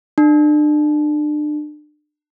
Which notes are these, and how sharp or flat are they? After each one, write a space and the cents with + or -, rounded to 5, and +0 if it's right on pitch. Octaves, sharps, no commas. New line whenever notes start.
D4 +35